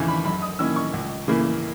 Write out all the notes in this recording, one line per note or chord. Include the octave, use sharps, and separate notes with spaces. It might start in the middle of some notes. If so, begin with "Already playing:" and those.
Already playing: D#2 C#3 E3
B5
F#2 B5
D#6
D#3 A#3 C#4 E4 E6
C#6
C#2
C#3 E3 A#3 E4